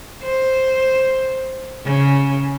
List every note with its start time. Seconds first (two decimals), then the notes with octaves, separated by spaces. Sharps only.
0.23 C5
1.85 C#3